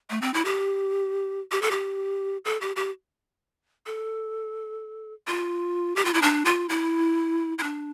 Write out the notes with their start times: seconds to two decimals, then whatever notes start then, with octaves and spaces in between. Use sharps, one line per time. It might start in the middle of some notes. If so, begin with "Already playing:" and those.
0.10 A3
0.22 C4
0.34 E4
0.45 G4
1.51 G4
1.62 A4
1.71 G4
2.45 A4
2.61 G4
2.76 G4
3.86 A4
5.27 F4
5.96 G4
6.05 F4
6.14 E4
6.22 D4
6.45 F4
6.69 E4
7.59 E4
7.63 D4